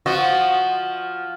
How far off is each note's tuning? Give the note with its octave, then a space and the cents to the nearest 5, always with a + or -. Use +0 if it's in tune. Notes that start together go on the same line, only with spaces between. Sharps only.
F3 +0 F#4 +0 D#5 -15